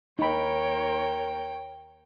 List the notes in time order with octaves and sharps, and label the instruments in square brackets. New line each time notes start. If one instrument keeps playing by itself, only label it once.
[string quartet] D#2 A#4 [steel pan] D#4 B5 [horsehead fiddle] C#5 [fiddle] G5